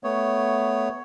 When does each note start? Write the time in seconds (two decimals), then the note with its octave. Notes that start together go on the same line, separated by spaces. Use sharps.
0.04 A3 B3 C#5